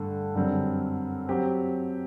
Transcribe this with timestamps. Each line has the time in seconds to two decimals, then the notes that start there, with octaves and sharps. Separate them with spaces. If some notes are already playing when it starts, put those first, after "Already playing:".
Already playing: G2 D3 A3
0.35 F#2 D3 G3 C4
1.28 F#3 C4 G4 C5